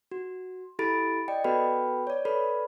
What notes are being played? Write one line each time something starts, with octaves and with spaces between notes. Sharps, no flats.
F#4
E4 G4 A4 B5 A6 D7
D5 D#5 G5
B3 F#4 A4 B4 G5 B5
C#5 D5
A4 B4 D5 B5